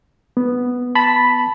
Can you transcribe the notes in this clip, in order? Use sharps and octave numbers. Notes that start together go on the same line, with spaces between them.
B3
A5 B5